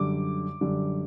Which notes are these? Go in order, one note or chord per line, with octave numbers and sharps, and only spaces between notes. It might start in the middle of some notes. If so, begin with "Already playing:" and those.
Already playing: F#2 D3 G3 D6
F#2 D3 G3